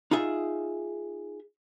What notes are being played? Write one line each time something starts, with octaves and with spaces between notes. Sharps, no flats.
D#4 F4 G#4 E5